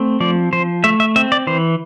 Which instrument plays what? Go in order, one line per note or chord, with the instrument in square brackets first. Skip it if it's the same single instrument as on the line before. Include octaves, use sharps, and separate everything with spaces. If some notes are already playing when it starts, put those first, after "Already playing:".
Already playing: [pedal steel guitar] A3 C4
F3 D5
F3 C5
A3 E5
E5
C4 E5
D5
E3 C5